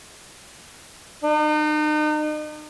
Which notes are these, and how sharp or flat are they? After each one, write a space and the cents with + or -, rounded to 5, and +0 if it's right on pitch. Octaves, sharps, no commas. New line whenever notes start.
D#4 -40